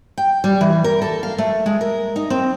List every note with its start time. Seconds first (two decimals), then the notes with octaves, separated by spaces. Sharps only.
0.18 G5
0.44 G3
0.61 E3
0.84 A#4
1.02 A4
1.23 F5
1.38 A3
1.66 G#3
1.81 A#4
2.16 D#4
2.30 C4